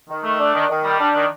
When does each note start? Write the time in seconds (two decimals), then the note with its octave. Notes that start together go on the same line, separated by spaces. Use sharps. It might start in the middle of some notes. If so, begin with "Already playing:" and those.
0.09 D#3
0.24 A3
0.39 D4
0.54 D#3
0.69 D#3
0.84 G3
1.00 D4
1.15 D#3